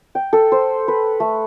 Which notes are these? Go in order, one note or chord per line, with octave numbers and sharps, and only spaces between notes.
G5
A4
C5
B4
A3